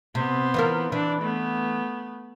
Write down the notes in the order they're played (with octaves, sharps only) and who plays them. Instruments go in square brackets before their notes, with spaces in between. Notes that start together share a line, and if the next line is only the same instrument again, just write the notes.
[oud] C3 [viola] B3 C5
[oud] E3 F4 A#4
[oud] E3 [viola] D4
[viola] A3 B3